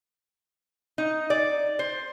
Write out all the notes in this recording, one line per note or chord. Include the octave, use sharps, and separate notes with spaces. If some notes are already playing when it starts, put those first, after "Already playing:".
D#4
D5
C5